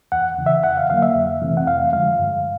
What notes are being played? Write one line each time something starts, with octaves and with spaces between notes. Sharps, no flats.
E2 F#5
C#3 E3
E5
F2 F#5
F5
D3 F#3 A#3 F5
E5
F2
C3 E3 A3 C4
F#5
F2 F5
D3 F3 G#3 F5
G2